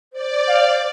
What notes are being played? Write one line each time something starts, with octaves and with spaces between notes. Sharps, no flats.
C5 D5
F5